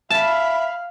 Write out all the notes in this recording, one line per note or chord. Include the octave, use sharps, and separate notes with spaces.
E5 F5 A5 B5